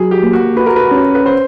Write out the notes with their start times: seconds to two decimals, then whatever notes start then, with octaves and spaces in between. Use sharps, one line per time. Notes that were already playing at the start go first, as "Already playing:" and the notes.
Already playing: F#3 G#4
0.11 G4
0.22 A#3
0.33 F#4
0.56 F#4 B4
0.66 A#4
0.76 B4
0.91 C#4
1.15 B4
1.26 C5